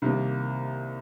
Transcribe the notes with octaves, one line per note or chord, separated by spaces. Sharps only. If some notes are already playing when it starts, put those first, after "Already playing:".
C2 C3 D#3 A#3